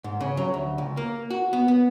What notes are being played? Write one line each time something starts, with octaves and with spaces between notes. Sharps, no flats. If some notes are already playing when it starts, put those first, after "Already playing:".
G#2
C#3
F#3
D2
C#2
A#3
F#4
B3
B3